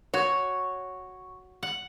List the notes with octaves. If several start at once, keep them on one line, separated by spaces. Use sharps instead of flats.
F#4 C#5
F#5